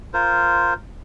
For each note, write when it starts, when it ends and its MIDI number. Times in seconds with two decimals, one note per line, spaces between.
0.14 0.74 65
0.14 0.74 70
0.14 0.74 72